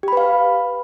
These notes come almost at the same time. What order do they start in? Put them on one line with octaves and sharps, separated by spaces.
G4 B5 B4 F5